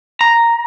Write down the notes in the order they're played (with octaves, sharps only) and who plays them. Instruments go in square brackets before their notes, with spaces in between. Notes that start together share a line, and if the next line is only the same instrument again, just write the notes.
[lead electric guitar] A#5